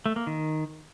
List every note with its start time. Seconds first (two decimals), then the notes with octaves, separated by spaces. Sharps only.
0.06 A3
0.16 A#3
0.27 D#3